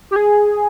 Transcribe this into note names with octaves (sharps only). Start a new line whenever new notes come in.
G4
G#4